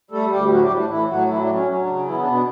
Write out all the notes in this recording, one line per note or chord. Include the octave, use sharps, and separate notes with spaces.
G3 A3 A4
D2 G3 G4
A2 F#3 F#4
G3 G4
A2
D4
A2 E3 E4
A2 F#3 F#4
E3 F#3 E4
D4
F#3
C#4
F#3 C#4
D4
C#3
E3 B3 E4
D4
B2
D4